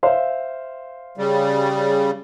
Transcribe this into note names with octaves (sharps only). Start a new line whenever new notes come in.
C5 E5 F5
C#3 G3